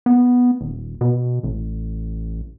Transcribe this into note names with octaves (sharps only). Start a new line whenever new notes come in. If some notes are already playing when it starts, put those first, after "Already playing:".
B3
D#1
B2
A1